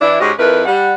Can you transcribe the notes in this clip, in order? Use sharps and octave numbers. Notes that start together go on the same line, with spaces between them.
E3 D4 E4
G#2 C#4 F#4 G4 D#5
F2 E4 A#4 B4
G3 F#5